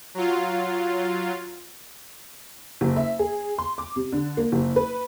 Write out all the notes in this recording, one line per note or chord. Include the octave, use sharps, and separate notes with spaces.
F#3 F4
F#1
E5
G#4
C6
D6
C3
D3
A#3
F#1
B4